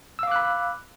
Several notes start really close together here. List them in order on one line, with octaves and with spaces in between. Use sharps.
E6 F5 D6 F#6 B5